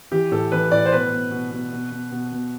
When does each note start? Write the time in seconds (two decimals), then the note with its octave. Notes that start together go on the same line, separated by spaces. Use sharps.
0.12 E3 G4
0.31 A2 A4
0.52 E3 B4
0.71 A2 D5
0.85 C5
0.92 B2 B4
1.12 B2
1.31 B2
1.51 B2
1.73 B2
1.91 B2
2.12 B2
2.31 B2